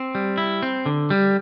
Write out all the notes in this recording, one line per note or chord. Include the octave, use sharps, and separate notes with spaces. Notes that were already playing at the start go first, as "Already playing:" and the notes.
Already playing: C4
G3
E4
C4
D3
G3